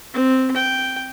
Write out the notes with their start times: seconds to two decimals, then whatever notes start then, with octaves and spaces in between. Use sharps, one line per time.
0.14 C4
0.57 G5